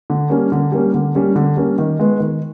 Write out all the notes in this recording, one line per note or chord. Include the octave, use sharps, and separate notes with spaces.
D3
G3 A#3 C#4
D3
G3 A#3 C#4
D3
G3 A#3 C#4
D3
G3 A#3 C#4
D#3
G#3 B3
D#3